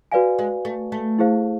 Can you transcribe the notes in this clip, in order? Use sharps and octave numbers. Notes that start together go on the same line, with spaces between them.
F#4 B4 D5 F5 G#5
G#3
A3
A3
E4 G#4 C5 F5